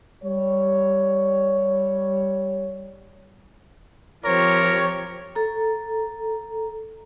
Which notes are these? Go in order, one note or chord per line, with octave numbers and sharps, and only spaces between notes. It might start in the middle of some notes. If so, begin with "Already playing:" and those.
G3 C#5
F3 C4 G4 A#4 C#5
A4 A#5